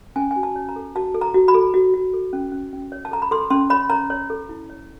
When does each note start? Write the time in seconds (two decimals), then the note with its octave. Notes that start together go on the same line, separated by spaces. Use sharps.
0.16 C#4 G#5
0.31 G#5
0.36 F#4
0.43 A5
0.56 C#5
0.69 A#5
0.76 A4
0.96 F#4 A5
1.14 A4
1.21 A#5
1.34 F#4
1.48 B5
1.54 A4
1.74 F#4
1.94 F#4
2.13 A4
2.33 C#4
2.52 C#4
2.73 C#4
2.92 C#5
3.05 A5
3.11 A4 A#5
3.22 B5
3.31 A4 C6
3.50 C#4 C6
3.70 C#5 B5
3.90 C#5 A#5
4.10 C#5
4.30 A4
4.49 E4
4.70 C#5